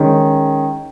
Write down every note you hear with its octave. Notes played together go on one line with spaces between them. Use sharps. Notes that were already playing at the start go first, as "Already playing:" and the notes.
Already playing: D#3 G#3 C#4